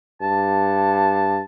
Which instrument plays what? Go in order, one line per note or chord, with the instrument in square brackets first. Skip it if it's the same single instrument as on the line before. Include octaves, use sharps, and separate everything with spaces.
[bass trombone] G2 [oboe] A5